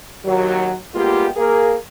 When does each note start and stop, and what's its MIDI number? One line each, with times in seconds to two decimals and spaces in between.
0.24 0.73 39
0.24 0.73 54
0.95 1.28 55
0.95 1.28 56
0.95 1.28 58
0.95 1.28 59
0.95 1.28 65
0.95 1.28 67
1.36 1.75 58
1.36 1.75 68
1.36 1.75 70